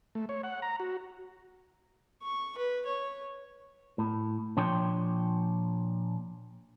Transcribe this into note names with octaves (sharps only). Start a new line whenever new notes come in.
A3
C#5
F#5
A#5
F#4
C#6
B4
C#5
A2
A#2 F3 D4 C#5 G5 C6